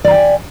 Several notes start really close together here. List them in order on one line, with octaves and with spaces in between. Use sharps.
D5 A#5 G5 G#5